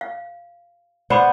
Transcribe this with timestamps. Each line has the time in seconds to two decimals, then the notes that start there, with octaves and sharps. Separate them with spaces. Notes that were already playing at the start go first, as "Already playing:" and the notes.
0.01 F5
1.10 B3 C5 D5 F#5 B5 D6